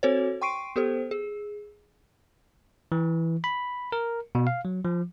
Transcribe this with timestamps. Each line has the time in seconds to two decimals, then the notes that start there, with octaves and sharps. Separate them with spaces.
0.03 C4 F#4 A4 C5 C#5
0.42 G5 C6 C#6 C7 D7 D#7
0.76 B3 G4 A4 C5
1.11 G#4
2.92 E3
3.44 B5
3.92 A#4
4.35 B2
4.47 F5
4.65 F#3
4.85 F3